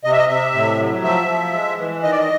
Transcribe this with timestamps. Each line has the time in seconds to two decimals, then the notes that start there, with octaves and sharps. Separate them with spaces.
0.04 C3 D#5
0.12 E5
0.18 D#5
0.29 C3 E5
0.54 A2
0.79 F#3
1.03 F3 E5
1.29 F3
1.53 G#3
1.79 E3
2.03 D#3 D#5
2.11 D5
2.19 D#5